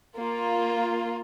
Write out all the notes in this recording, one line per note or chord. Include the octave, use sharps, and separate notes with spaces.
A#3 F4